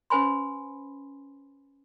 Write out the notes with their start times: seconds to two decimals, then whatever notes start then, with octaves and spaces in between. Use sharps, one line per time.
0.10 C#4 B4 C5 G#5 B5 C6